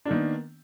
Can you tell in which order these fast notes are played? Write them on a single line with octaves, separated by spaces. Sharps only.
D4 A#3 D#3 B3